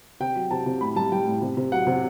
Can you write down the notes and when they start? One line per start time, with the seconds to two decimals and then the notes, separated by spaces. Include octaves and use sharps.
0.20 C3 G5
0.35 F#3
0.51 C3 A5
0.66 C3
0.81 A2 B5
0.96 G3 A5
1.12 G3 G5
1.26 A2
1.42 C3
1.57 C3
1.72 F#3 F#5
1.87 C3